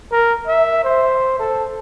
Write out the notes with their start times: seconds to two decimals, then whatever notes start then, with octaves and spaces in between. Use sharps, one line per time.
0.12 A#4
0.47 E5
0.84 C5
1.39 A4